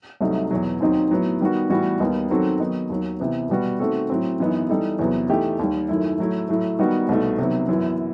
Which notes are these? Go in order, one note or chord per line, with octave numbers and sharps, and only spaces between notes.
C2 C3 F#3 A3 D#4
E2 B2 F#3
D#2 D#3 F#3 C4 D#4
A2 F#3 B3
D#3 G3 B3 F#4
A2 E3 G3 B3 F#4
D#2 D#3 G3 B3 D#4
D#3 F#3 C4 F#4 A4
D#3 F#3 B3 D#4
D#2 D#3 F#3
C3 E3 B3
B2 G3 B3 F#4
D#3 A3 C4 F#4 A4
A2 F#3 C4
F#2 E3 B3 D#4
E3 G3 D#4 A4
E2 C3 F#3 B3
E3 A3 D#4 G4
D#2 D#3 G3
F#2 D#3 A3 E4
A2 F#3 A3 E4
A2 F#3 A3
D#3 G3 B3 D#4 F#4
C2 B2 A3 D#4
C3 D#3 F#3 B3
F#2 E3 B3 E4